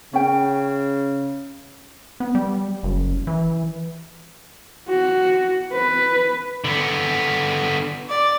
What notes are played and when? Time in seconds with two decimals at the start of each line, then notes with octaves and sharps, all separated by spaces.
0.13 C#3 C#4 G5
2.20 B3
2.35 G3
2.83 F#1
3.27 E3
4.89 F#4
5.73 B4
6.65 D3 B3
8.09 D5